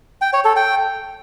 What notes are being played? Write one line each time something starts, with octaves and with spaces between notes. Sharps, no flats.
G5
C#5
A4
G5